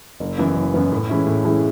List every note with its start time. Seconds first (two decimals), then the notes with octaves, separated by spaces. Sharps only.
0.20 F#1
0.38 F#2 E3 B3
0.56 F#1
0.74 F#2 E3 B3
0.92 A2
1.09 E3 G#3 C#4 E4
1.27 A2
1.45 E3 G#3 C#4 E4